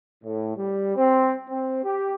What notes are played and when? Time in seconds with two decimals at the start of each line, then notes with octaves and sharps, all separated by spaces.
0.24 A2
0.57 G3
0.96 C4
1.49 C4
1.84 G4